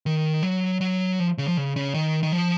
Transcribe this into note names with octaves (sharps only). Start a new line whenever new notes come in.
D#3
F#3
F#3
F3
C#3
F3
C#3
C#3
D#3
D#3
F3